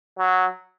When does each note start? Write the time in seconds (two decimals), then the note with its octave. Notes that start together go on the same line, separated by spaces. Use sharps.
0.19 F#3